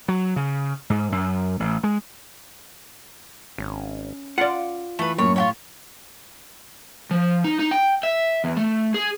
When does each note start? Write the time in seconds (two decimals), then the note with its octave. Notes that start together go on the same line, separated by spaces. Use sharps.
0.08 F#3
0.36 C#3
0.90 G#2
1.12 F#2
1.60 A1
1.83 G#3
3.58 G#1 C#4
4.38 F4 D5 F#5
4.99 E3 A3 B4
5.18 F#2 A2 A#3 C#4 C#5
5.36 A2 F4 G4 C#5
7.11 F3
7.44 D#4
7.59 D#4
7.71 G5
8.03 E5
8.44 E2
8.57 A3
8.94 G#4